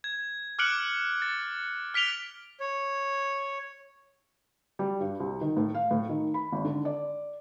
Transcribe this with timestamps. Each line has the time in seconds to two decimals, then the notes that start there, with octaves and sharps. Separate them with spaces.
0.04 G#6
0.59 D6 F6 F#6 C#7 D7 F#7
1.22 A6
1.94 F6 B6 D7 F7 G7
2.60 C#5
4.79 G3
5.00 G2
5.20 C2
5.41 D#3
5.57 A2
5.75 F5
5.91 A2
6.09 D#3
6.34 B5
6.52 G#1
6.65 D3
6.85 D5